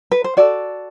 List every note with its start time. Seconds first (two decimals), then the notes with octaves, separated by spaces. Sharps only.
0.12 B4
0.24 C5
0.37 F#4 A4 D5